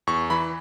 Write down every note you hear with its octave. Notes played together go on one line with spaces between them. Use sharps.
E2 C#6
E3 B5